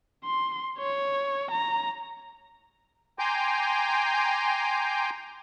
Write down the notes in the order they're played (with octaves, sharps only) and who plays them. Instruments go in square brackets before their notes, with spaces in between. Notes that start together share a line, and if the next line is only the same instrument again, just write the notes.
[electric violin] C6
C#5
A#5
[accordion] G5 G#5 A#5 C6 D6 G6